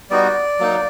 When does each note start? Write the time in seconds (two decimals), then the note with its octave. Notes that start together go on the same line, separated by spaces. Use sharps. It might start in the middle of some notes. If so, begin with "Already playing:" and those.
0.10 G3 B3 D#4 F#4 D5
0.59 F#3 A#3 D#4